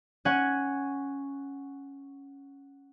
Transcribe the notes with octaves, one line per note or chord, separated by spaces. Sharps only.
C#4 F#5 G#5